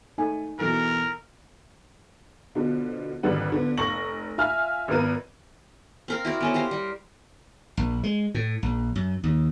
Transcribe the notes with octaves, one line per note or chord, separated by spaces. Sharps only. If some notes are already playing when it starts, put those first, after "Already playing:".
A3 D#4 G#5
B2 E3 A4 A#4
B2 D3 F3
G#1 F2 D3 G3 B4 F#5
D3 F3 B3
F1 C#6 A#6 F#7
F4 E5 G#5 F6
G#1 F3 B3 A#4 B4 D#7
C4 A#4 F5
E4 F#4 D5
B3 C#4 A4
G4 A#4 C5 F5
G3
A#1
G#3
A2
A#1
F#2
D#2